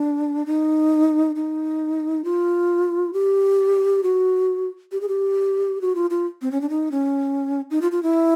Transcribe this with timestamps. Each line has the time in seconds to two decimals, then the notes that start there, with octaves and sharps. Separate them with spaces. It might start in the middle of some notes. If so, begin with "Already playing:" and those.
Already playing: D4
0.46 D#4
1.36 D#4
2.24 F4
3.13 G4
4.03 F#4
4.92 G4
5.01 G#4
5.08 G4
5.81 F#4
5.95 F4
6.10 F4
6.42 C4
6.51 C#4
6.61 D4
6.69 D#4
6.91 C#4
7.71 D#4
7.81 F4
7.92 F4
8.03 E4